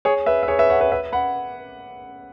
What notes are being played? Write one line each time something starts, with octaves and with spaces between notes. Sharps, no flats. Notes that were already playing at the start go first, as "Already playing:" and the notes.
G#4 C#5
B4 E5
E5
G#4 C#5
B4 E5
C#5 F#5
B4 E5
B4 E5
F#5 B5